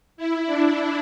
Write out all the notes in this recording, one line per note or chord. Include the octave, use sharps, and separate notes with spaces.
E4
D4